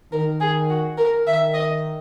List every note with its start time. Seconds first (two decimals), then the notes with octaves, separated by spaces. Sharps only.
0.12 D#3 A#4
0.41 G#4
0.70 F#4
0.98 A#4
1.26 D#3 E5
1.54 D#5